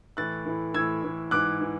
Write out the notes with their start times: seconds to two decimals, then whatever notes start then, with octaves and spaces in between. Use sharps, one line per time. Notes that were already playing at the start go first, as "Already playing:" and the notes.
0.17 A2 E3 F#6 A6
0.46 A2 E3
0.74 A2 E3 E6 G#6
1.03 A2 E3
1.31 G#2 E3 D6 F#6
1.61 E3